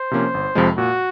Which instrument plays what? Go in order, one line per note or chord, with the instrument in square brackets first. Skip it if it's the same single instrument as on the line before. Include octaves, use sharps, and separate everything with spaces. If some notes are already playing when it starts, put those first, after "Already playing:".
Already playing: [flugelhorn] C5
[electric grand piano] C3 F3 A#3 C#4
G1
F2 C3 F3 G#3
[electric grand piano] A#2 [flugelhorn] F#4